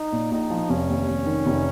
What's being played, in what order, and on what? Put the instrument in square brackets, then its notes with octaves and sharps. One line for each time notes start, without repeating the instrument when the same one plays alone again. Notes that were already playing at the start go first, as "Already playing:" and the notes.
Already playing: [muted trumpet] D#4
[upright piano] A#2
[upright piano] A#1 [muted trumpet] D#4
[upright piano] F3
[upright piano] F1 [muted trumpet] C#4
[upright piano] D#2
F1
D#3
F1